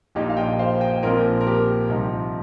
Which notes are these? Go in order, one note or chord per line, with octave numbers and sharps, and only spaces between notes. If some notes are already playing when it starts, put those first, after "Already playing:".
A#1 A#2 F3 D#4 G4
F5
D#5 G5
C5 F5
D#5 G5
A#1 A#2 F3 C4 A#4 D#5
A#4
G4
C2 C3 F3 D#4